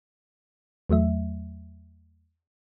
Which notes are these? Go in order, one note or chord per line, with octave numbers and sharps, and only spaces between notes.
E2 F#3 A3 E5